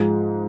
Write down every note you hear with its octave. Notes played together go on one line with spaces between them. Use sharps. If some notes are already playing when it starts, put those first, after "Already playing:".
Already playing: G#2 F3 G#3